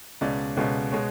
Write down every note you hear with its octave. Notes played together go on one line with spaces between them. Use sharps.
C#2 B2 G#3 C#4 D5
C#2 B2 G#3 C#4
B2 G#3 C#5